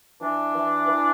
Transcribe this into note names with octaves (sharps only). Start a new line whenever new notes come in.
E3 D4
E3
E3